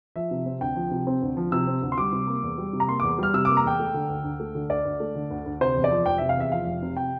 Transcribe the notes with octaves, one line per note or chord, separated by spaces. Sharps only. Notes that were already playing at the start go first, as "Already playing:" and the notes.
F3 E5
C3
C4
D2 G5
F3
C3
C4
D2
F3
C3 E6
C4
D2
C6
G3 D6
C3
A#3
E2
G3
C3
A#5
A#3 C6
E2 D6
G3 F6
C3 E6
A#3 D6
A#5
E2 G5
A3
D3
D2
D2
A3
D3
D2 D5
D2
A3
D3
D2
D2
C3 C5
E2
D5
F3
F1 G5
C3 E5
F5
E2 E5
F3 F5
F1
C3
G5